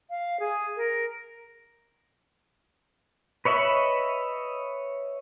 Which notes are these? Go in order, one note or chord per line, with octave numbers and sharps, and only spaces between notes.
F5
G#4
A#4
B4 C#5 D#5 E5 B5